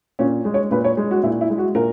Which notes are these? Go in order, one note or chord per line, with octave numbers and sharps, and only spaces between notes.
A#2 C#4
G#3
C#5
A#2 B4
C#5
G#3
F#4
A#2 E4
E4
G#3
F#4
A#2 A#4